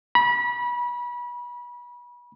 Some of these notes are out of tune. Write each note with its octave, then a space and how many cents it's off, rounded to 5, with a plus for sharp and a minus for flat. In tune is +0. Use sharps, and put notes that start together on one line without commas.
B5 -30